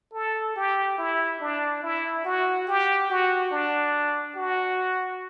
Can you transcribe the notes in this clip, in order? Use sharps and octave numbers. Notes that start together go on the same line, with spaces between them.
A4
G4
E4
D4
E4
F#4
G4
F#4
D4
F#4